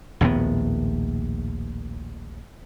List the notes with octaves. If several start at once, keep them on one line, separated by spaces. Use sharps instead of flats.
A#1 D#2 A2 B3